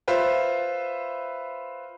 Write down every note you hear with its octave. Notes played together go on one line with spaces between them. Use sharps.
F4 B4 C5 E5